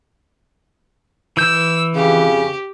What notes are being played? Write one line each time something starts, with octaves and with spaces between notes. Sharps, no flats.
E3 E6 G6
F2 C#3 G4